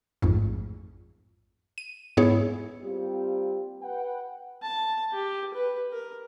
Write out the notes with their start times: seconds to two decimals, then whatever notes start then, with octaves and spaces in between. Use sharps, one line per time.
0.22 A1 F2 G#2
1.78 D#7
2.17 G#2 B3 E4 G#4 C#5
2.81 G3 A#3 C4 F4 G4
3.83 B4 F#5 G5
4.63 A5
5.13 G4
5.54 B4
5.92 A#4